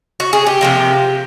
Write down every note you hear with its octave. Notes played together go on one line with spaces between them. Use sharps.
F#4
G#4
G4
C3 F3 A#3